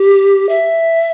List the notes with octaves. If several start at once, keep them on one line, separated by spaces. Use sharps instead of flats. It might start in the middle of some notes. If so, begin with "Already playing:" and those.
Already playing: G4
E5